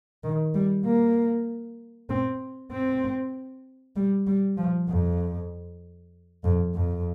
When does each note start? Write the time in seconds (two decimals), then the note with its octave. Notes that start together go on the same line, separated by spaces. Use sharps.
0.24 D#3
0.54 G3
0.85 A#3
2.10 C4
2.71 C4
3.96 G3
4.27 G3
4.57 F3
4.89 F2
6.44 F2
6.75 F2